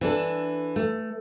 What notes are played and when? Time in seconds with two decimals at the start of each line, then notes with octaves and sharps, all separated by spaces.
0.01 E3 D4 A4
0.76 A3